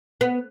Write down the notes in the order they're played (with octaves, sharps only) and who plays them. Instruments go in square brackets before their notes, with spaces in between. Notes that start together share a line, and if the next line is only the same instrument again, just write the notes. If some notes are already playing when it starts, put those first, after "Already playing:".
[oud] B3